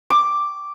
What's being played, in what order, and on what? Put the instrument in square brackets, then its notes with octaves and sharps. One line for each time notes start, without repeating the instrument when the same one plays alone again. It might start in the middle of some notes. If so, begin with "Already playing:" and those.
[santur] D6